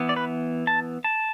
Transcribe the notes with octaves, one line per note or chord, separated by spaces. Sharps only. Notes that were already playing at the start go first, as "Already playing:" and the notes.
Already playing: E3 B3
D5
B4
A5
A5